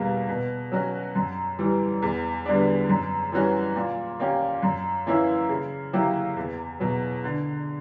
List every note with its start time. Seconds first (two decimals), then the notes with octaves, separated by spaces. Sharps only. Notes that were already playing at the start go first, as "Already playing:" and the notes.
Already playing: E2 B2 G3 A#3
0.28 B2
0.72 F#3 C#4 F#4
1.15 F#2
1.59 E3 G3
2.02 E2
2.46 D3 G3 B3 D4
2.89 F#2
3.32 E3 G3 C#4 F#4
3.76 A#2
4.20 A#3 C#4 G4
4.63 F#2
5.06 E3 A#3 C#4 E4
5.49 C#3
5.93 F#3 A#3 E4 G4
6.36 E2
6.80 B2 F#3
7.24 D3